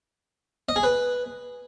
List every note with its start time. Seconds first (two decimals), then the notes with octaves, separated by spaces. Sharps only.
0.69 D#5
0.76 G#4
0.83 B4